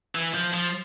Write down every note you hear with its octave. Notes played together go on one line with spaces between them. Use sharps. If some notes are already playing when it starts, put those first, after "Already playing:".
E3
F3
F3